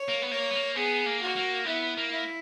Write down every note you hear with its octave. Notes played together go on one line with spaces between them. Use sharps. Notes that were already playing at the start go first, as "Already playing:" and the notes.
Already playing: C#5
A#3
B3
A#3 C#5
B3
A#3
B3 G#4
A#3
F#4
A#3
B3 E4
A#3
E4